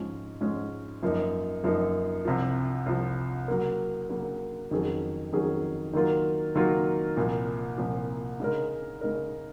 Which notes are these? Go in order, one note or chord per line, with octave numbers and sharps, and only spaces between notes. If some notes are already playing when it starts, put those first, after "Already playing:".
Already playing: G#2 F3 G#3 C#4
G#2 F3 G#3 C#4
F#2 F3 A#3 D#4
F#2 F3 A#3 D#4
C2 C3 F3
C2 C3 F3
C#3 F#3 A#3
C#3 F#3 A#3
F2 D#3 F#3 C#4 G#4
F2 D#3 F#3 C#4 G#4
D#3 F#3 A#3 F4
D#3 F#3 A#3 F4
C2 A#2 F3
C2 A#2 F3
C#3 G#3 D#4 A#4
C#3 G#3 D#4 A#4